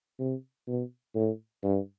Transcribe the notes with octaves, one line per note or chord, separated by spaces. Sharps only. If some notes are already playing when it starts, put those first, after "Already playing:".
C3
B2
A2
G2